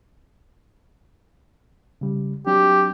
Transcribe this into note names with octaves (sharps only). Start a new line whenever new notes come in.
C#3 G3
F#3 C4 D4 G4